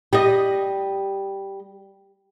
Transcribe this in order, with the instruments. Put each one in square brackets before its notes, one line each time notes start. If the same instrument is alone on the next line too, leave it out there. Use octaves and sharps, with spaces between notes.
[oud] G3 D#5